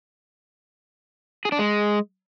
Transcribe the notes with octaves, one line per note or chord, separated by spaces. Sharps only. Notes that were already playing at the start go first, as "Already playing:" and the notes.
G#4
D4
G#3